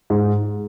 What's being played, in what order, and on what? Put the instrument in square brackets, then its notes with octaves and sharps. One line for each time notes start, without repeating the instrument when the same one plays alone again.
[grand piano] G#2